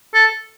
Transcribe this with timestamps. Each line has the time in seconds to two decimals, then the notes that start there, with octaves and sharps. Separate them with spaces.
0.14 A4